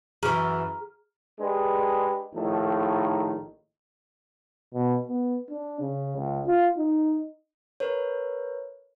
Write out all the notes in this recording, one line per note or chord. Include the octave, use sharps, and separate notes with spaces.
F#2 E3 G#4 A#5 F6
G#3 D4 G4 G#4 B4
A#1 A2 D#3 D#4 A4
B2
B3
D4
C#3
C#2
F4
D#4
A#4 B4 C#5